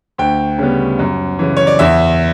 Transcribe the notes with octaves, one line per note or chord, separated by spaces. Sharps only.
D2 G5
C#3 G3 B3
F#2
C#3 E3
C#5
D5
E2 E5